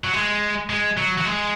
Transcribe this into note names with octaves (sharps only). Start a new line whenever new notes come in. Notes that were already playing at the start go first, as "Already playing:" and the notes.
F#3
G#3
G#3
F#3
F#3
G#3